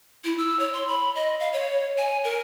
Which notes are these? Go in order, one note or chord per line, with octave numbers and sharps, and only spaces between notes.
E4
E6
C#5
C6
B5
D#5
F5
C#5
G#5
A#4